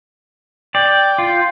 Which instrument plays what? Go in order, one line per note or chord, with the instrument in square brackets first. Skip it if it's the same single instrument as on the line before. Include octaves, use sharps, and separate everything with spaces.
[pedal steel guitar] D5 [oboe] G5
[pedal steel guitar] F4